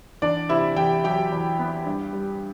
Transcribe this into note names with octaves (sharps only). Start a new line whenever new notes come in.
E2 D4 D5
C3 E4 E5
E2 G4 G5
F#3 G4 G5
E2
B3
G2
G3